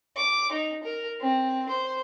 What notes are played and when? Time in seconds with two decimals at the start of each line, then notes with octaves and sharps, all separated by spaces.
0.16 D6
0.52 D#4
0.83 A#4
1.20 C4
1.69 C5